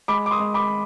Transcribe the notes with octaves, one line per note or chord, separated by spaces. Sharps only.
G#3 B5 D6
D6
C6 D#6
G#3
B5 D6